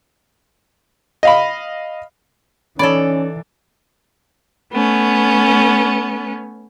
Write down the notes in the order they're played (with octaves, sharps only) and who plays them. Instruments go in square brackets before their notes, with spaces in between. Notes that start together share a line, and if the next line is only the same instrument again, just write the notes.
[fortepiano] D#5 F5 B5
[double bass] E3 [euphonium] C#4 [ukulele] D#4 C#5 B5 [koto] A4 D5
[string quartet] A3 B3 C#4